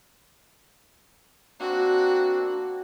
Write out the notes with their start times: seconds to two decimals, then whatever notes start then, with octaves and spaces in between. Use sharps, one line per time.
1.60 A#3 C4 D4 F#4